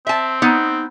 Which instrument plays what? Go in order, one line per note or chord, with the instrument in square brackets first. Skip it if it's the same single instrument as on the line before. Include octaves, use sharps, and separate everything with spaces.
[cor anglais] C4 [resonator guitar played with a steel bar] E5 A5
[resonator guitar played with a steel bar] B3 D#4